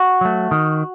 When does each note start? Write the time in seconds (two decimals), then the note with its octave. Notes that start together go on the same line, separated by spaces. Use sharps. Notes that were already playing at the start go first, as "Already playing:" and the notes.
Already playing: F#4
0.21 F#3 A3
0.51 D#3